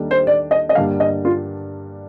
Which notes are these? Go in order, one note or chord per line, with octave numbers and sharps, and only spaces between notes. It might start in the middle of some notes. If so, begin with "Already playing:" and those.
Already playing: D#2 D#3 G3 D4 A4
C5
D5
D#5
D#5
G2 D3 G3 A#3 D4 F5
D#5
F4